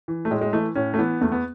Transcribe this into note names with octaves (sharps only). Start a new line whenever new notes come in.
E3
A3
A2 G#3
G#3
E3 A3
A2 C#4
A3
E3 B3
E2 A3
B3